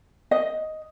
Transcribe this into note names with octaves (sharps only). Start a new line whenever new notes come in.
D#5